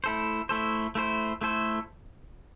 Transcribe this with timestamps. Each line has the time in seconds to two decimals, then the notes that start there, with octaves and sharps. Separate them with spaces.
0.04 A3 E4 A4 C5
0.49 A3 E4 A4 C5
0.95 A3 E4 A4 C5
1.41 A3 E4 A4 C5